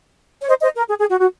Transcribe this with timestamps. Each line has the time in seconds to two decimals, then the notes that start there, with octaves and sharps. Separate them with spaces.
0.41 C#5
0.48 C5 D#5
0.62 C5 D#5
0.76 A#4
0.89 G#4
1.00 G#4
1.10 F#4
1.20 F#4